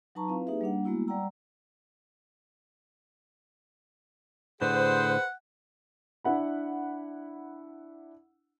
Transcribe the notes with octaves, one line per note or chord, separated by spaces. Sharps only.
F#3 D#4 B4 A5 A#5 C#6
C4 E4 F4 B4 F5
A#3 D#4 G4 G#4 B4 E5
G3 A#3 D4 F#5
G3 G#3 A#3 B3 E4 F#4
G3 D5 F#5 G5 A#5 E6
A2 D3 G#4 B4 C5 F#5
D4 E4 F#5 B5